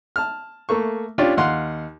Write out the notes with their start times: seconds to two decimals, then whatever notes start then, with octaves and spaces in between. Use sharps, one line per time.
0.16 A5 F6
0.69 A3 A#3 C#6
1.18 C#4 D4 F4 G4
1.37 D#2 F5 F#5 C6